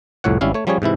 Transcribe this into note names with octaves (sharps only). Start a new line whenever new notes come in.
C2 F2 A2 C#5 F#5
G#1 G3 C#4 E4 F5
A3 C#5
F3 G3 C#4 G#4 C#5
G#2 C3 E3 E4